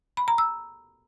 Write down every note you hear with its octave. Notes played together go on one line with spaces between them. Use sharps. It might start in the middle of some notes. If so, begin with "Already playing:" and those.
B5
A#5
E6